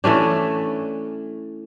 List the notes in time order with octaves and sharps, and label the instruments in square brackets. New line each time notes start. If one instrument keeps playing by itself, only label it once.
[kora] E3 A3 C#4 D4